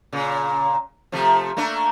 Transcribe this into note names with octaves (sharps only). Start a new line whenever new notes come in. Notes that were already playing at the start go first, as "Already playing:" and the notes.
A#2 C#3
C3 F3 A3
A3 A#3 D4